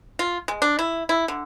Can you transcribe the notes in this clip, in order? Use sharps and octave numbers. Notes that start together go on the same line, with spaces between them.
F4
G#3
D4
E4
E4
D3